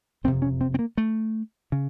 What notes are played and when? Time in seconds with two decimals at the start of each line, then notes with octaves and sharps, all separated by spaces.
0.24 F#1 F2 C3 C4
0.42 C#4
0.61 C4
0.74 C4
0.79 A#3
0.98 A3
1.72 C#3